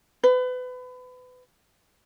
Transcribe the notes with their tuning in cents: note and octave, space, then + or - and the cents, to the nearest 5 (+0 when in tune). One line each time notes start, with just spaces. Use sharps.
B4 +30